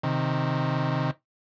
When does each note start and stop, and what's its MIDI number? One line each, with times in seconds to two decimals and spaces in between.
0.03 1.11 48
0.03 1.11 51